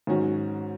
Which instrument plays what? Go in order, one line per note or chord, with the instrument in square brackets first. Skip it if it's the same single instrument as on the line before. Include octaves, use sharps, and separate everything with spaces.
[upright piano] G#2 D#3 F#3 C#4 F#4